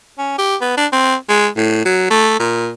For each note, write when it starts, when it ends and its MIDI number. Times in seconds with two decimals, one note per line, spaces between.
0.18 0.38 61
0.38 0.56 67
0.61 0.74 59
0.77 0.86 62
0.92 1.15 60
1.29 1.47 56
1.56 1.81 45
1.85 2.06 54
2.10 2.35 57
2.39 2.71 46